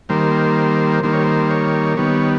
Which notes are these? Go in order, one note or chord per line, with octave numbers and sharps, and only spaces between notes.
D#3 G3 A#3 C5
D#3 G3 A#3 C5
C#5
C5
C#5
D#3 G3 B3 C#5